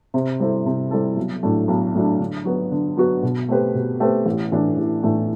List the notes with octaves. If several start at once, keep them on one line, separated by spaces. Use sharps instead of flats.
C3
G3 C4 E4 A4
C3
G3 C4 E4 A4
B1
A2 F#3 A3 D4
B1
A2 F#3 A3 D4
D3
F#3 B3 F#4
D3
F#3 B3 F#4
B2
A3 C4 G4 B4
B2
A3 C4 G4 B4
A1
A2 E3 A3 D4
A1
A2 E3 A3 D4